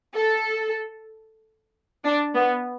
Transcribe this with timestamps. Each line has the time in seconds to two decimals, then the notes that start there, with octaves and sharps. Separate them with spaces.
0.16 A4
2.04 D4
2.35 B3